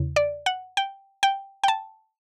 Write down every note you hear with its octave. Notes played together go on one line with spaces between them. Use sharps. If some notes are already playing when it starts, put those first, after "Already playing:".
Already playing: E2 C#3
D5
F#5
G5
G5
G5
A5